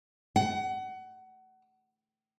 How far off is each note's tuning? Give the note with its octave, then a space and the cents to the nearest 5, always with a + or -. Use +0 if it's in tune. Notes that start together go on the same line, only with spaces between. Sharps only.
F#5 +25